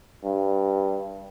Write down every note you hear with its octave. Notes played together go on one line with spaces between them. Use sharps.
G2